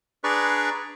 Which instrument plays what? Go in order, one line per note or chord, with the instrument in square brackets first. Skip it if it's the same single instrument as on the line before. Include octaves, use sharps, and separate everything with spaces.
[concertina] D4 G#4 B4 D5 A#5 C#6